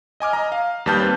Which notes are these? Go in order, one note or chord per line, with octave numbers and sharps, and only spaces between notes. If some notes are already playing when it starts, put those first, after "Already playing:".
D#5 G#5 D6 F6
D#5 A#5
F5
D#2 G3 B4 A5 F6 G6
A#3 C4 B4